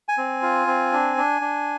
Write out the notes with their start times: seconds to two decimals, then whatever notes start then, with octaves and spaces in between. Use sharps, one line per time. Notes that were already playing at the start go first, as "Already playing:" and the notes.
0.09 G#5
0.18 C4
0.42 F4
0.67 C4
0.92 D4
1.17 D4
1.41 D4